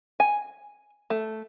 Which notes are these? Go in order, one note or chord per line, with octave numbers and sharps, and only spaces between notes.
G#5
A3